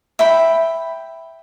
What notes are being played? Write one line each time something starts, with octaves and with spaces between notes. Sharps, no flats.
E5 G5 B5